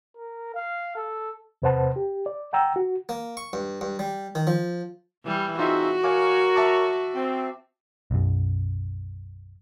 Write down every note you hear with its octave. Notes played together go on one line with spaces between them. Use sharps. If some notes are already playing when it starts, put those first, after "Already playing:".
A#4
F5
A4
E2 C3 B4 C5 F#5 A5
G4
D5
F#5 G5 A#5 E6
F#4
A#3
C#6
G2
G2
G3
D#3
F3
E3 G3
C4 D#4 F4 F#4 G#4 E5
A#4 C#5 F5 G#5 D6
E5 A5 D6
C4
B1 F#2